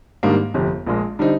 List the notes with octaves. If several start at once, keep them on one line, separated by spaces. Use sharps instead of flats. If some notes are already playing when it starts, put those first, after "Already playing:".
G#2 D#3 G3 A#3 D4
G1 F2 C3
A#1 A#2 G#3
D3 G3 C4 D#4